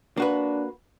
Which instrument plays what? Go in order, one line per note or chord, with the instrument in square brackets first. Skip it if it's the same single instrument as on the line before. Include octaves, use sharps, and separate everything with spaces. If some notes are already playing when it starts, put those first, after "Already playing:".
[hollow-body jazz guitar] A#3 F#4 B4 [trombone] D4